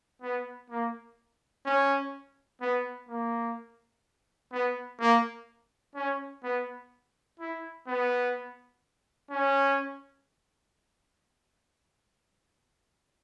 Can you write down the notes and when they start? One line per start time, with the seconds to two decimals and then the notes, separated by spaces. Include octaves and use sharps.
0.22 B3
0.70 A#3
1.66 C#4
2.61 B3
3.09 A#3
4.53 B3
5.00 A#3
5.95 C#4
6.44 B3
7.40 E4
7.88 B3
9.31 C#4